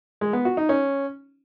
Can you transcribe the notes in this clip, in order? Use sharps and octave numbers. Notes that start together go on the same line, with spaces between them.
G#3
B3
F#4
D#4
C#4